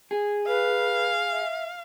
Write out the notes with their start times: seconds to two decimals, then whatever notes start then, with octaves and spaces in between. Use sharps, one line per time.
0.11 G#4
0.48 B4 F5
1.32 E5